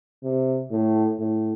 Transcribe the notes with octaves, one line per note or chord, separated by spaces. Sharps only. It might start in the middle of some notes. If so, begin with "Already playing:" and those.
C3
A2
A2